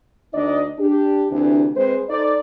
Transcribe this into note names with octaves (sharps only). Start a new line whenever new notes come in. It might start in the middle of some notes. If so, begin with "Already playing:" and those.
D2 D4 D#4 D5 D#5
D4 G4
D2 C3 E3 D4
G#3 C4 B4 C5
D#4 A4 C5 D5